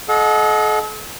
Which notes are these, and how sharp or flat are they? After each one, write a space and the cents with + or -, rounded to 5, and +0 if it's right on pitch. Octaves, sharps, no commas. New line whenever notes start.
A4 -40 D#5 +0 F#5 -35